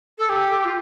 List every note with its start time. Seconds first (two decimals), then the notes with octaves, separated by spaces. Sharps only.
0.19 A4
0.29 G4
0.65 F4